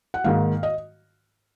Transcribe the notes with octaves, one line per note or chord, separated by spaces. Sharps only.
F#5
G#2 D#3 A#3 F5
D#5